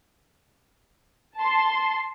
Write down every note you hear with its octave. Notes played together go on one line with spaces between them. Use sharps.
A5 C6